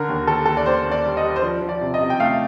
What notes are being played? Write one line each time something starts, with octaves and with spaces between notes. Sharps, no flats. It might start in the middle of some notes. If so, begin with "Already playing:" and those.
Already playing: D3 A#4
D#2
D#2 A4
D#2 A4
D5
D#2 C5
D#2
D5
G3
D#5
G3
C5
F3 D5
F3
D5
C3
D#5
C3
G5
A3 F5